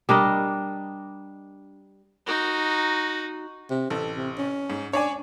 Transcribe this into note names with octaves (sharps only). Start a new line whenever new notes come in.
G3 D4 A#4 D#5
D#4 F#4
C3
A1 A4
C3
C#4
G#2
D4 C#5 D5 G#5